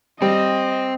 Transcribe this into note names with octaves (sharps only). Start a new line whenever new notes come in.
G3 C4 D#5